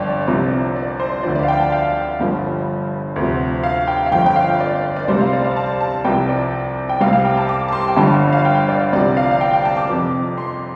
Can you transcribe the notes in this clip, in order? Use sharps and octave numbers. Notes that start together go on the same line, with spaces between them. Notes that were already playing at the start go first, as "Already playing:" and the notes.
Already playing: G1 F2 D5 G5 A5
C2 C3 F3
D5
C5
D2 D3 F3 D5
D5
F5
G5
A5
F5
G1 G2 F3
D2 C3 F3
F5
G5
F5
G1 F2 F3 G5
G5
F5
D5
D5
C2 C3 G3 C5
F5
D5
F5
A5
A5
C2 C3 F3 G5
D5
G5
C2 C3 G3 F5
F5
G5
A5
D6
A5
C6
G5
G1 G2 D3 F3 A5
F5
G5
D5
C2 C3 F3 D5
F5
F5
G5
G5
A5
D6
F2 C3 F3
C6